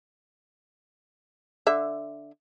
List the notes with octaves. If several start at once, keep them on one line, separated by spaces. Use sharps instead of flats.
D3 E5